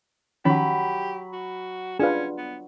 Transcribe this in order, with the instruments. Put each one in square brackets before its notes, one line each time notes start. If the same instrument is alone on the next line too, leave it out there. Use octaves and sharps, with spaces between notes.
[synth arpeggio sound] D#3 F3 C#4 [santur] F#3 B5 [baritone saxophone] G4
[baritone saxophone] F#4
[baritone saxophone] C#4 [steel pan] D4 F4 B4 [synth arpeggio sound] G#4 F5
[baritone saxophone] B3